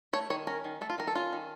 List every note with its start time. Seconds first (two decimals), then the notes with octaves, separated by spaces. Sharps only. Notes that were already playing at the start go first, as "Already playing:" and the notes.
0.13 A3 C#5
0.30 D#3 C#5
0.47 C#4 A#4
0.64 D#3
0.81 A3 A4
0.90 F4
0.98 D#3 A#4
1.07 A4
1.15 C#4 F4
1.33 D#3